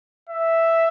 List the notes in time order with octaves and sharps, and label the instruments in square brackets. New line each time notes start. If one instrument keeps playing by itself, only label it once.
[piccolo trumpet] E5